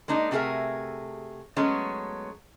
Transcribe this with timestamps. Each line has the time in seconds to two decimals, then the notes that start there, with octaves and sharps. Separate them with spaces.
0.08 G#3 A#3 D4 D#4
0.31 C3 A3 F#4 G#4 A#4 E5
1.56 F#3 G#3 A3 B3 C#4